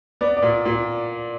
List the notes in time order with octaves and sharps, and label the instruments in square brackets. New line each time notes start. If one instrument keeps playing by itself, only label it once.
[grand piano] B3 [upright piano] D5
[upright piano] D5
[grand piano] A#2
A#2